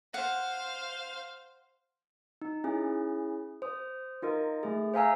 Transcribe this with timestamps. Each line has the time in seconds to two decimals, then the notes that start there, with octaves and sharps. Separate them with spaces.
0.14 C5 F5 F#5
2.42 D#4
2.64 C#4 E4 G#4
3.62 C5 D#6
4.22 D#4 F4 A#4 D#5
4.63 A3 G#4
4.94 C5 E5 F5 G#5 A#5 E6